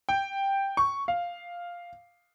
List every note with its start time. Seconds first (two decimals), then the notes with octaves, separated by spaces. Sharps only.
0.09 G5
0.77 C#6
1.08 F5